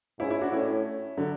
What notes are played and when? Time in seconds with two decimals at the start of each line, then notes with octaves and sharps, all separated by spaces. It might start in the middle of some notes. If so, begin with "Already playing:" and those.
0.19 G#2 C#4 E4
0.30 C#4 E4
0.41 D4 F#4
0.52 A2 C#4 E4
1.17 D3 F#3